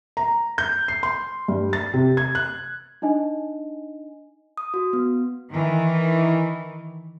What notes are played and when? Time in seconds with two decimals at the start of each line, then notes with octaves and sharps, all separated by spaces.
0.17 A#5
0.58 G6
0.88 C7
1.03 C6
1.48 G2
1.73 A6
1.94 C3
2.17 G#6
2.35 F#6
3.02 D4 D#4 D#5 G#5
4.57 D#6
4.74 F#4
4.93 B3
5.49 D#3 E3